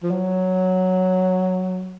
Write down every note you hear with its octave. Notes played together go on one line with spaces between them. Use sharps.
F3
F#3